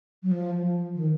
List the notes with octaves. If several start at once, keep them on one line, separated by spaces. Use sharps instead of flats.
F#3
F3
D#3